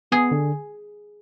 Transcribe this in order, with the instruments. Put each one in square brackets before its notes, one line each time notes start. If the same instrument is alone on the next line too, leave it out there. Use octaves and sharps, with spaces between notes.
[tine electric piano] B3 [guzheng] G#4
[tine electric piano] D3